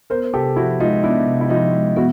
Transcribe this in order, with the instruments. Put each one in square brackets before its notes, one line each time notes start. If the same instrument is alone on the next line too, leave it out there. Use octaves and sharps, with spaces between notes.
[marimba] B3 [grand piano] A#4 C5
[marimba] C3 [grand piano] G4 A4
[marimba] F3 [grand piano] E4 F#4
[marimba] G#3 [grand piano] D#4 F4
[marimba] B3 [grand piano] D4 E4
[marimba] C3
[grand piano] E4
[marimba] F3 [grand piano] D#4 F4
[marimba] G#3
[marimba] B3 [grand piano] E4 F#4